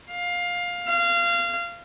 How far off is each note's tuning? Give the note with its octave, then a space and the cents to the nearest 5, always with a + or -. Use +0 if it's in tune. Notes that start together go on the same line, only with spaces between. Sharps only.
F5 +15
F5 -20